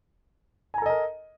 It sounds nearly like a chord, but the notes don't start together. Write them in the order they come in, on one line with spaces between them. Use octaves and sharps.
G#5 A#5 A4 D#5 A#4